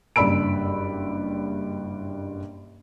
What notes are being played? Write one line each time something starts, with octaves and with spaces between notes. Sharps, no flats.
F#1 G2 D5 B5 E6 D7